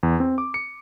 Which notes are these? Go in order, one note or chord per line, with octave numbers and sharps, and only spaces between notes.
E2
C4
D6
C#7